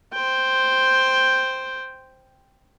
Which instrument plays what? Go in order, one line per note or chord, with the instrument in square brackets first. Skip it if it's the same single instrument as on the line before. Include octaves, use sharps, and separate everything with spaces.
[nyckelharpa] C5 G5